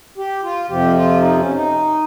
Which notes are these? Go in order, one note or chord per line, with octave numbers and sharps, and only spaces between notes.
G4
F4
F2 C3 F3 G4
F4
D#4
C#4
D#4